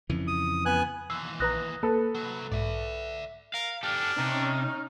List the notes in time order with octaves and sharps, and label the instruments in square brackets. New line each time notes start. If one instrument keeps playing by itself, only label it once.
[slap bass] F2 C#3 E3
[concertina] D#6
B3 G#5 F#6
[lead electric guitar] D#2 E3 [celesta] E6 [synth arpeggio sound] C7
[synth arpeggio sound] A#1 B4 A#5 [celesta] D#6 F#6 A#6
[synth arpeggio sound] A#3 [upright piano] A4 B4
[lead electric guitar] C2 F#3
[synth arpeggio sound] B1 G#2 [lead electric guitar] D5 E5
[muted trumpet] A#4 [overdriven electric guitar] F5
[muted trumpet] D4 [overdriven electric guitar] G4 A4 [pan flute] F6
[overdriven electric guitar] C3 [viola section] C#4 D#4